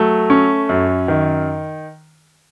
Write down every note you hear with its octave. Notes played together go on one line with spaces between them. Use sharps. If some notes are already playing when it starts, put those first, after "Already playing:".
Already playing: F#3 A3
C#4
F#2
D#3